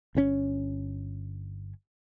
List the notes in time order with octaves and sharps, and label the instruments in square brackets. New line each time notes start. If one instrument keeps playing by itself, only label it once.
[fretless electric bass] G1 C3 C#4